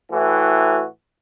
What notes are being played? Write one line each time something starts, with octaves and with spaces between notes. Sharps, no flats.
A2 E3 F#4